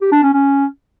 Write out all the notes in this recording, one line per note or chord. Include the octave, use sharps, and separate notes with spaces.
G4
D4
C#4
C#4